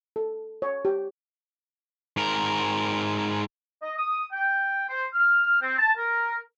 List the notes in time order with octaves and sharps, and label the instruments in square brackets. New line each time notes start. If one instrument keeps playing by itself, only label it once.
[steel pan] A4
C#5
G4
[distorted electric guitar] G#2 A#4
[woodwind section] D#5
D#6
G5
C5
F6
C4
A5
A#4